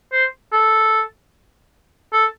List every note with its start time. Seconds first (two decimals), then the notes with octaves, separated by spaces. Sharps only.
0.12 C5
0.52 A4
2.13 A4